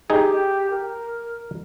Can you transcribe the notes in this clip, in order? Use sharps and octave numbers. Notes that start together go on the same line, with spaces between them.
D#4 G4 G#4
A#4